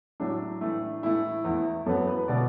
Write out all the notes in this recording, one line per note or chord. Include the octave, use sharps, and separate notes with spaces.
A2 F#3 A3 D4
A2 E3 A3
A2 E3 A3 E4
E2 E3 A3
F#2 E3 B3 A4
B4
B2 A3 D5